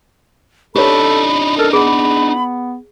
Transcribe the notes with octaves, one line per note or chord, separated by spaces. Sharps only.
D4 D#4 G4 A4 C#5 B5
A4 A#4
B3 G#4 B5